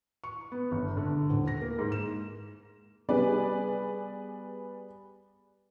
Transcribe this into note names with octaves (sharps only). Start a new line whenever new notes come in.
C#6
B3
G1
D3
D#1
A#6
A#3
G#2
E7
G3 B3 G#4 B4 D5